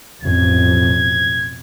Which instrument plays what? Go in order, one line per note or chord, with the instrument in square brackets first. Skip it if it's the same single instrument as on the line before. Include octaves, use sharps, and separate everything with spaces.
[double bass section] A1 F2 B2 [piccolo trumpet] G#6